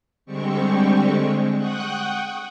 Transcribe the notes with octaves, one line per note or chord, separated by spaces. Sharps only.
D3 G3 G#3 C4 G4 C#6
G#3
F#5 G5 C#6 D#6 F#6